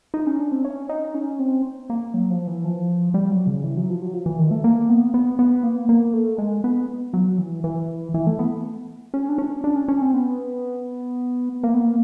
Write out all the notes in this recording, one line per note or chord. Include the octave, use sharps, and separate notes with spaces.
D#4
C#4
D4
C4
C#4
D#4
C#4
C4
A#3
F#3
F3
E3
F3
G3
F#3
C#3
E3
F#3
F3
F#3
F3
E3
D#3
A3
A#3
B3
B3
B3
A#3
A#3
A3
G#3
B3
F#3
E3
E3
E3
A3
B3
C#4
D4
C#4
D4
C#4
C#4
C4
B3
A#3
B3
A#3